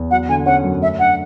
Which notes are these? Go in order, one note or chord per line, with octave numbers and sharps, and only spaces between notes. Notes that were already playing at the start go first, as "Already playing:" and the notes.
Already playing: E2
F#3 F#5
D3 G#5
C#4 F#5
F#2
A3 E5
D4 F#5